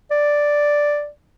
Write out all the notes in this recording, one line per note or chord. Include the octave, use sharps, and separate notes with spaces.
D5